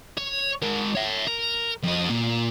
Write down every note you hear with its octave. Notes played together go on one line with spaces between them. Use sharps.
C#5
G#3 A#4
C#5 E5
A#4
F2 D#5
A#2